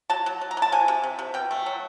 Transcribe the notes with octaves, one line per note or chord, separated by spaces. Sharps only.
F#3 A5
F#3
F#3
A#5
F#3
A5
C3 G#5
C3
C3
C3
B2 G5
A3
F#3